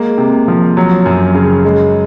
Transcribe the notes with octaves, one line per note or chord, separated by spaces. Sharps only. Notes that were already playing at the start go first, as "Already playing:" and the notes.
Already playing: G#3 A#3
C3
F3
F#3
F#2
C#3
G#3